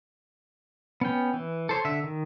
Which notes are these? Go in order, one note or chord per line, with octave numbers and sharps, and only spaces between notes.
B3 C#4 G5
E3
A4 C5 C#5
D3 E5
D#3